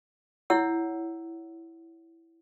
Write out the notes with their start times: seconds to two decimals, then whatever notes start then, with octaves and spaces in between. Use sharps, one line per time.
0.50 E4 C#5 F#5 E6